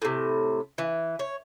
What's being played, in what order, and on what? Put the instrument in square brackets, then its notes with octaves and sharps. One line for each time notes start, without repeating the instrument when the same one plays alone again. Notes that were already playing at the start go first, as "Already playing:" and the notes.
[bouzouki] A2 C3
E3
C#5